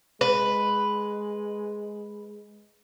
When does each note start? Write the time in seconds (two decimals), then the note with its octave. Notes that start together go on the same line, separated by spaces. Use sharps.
0.21 G#3 B4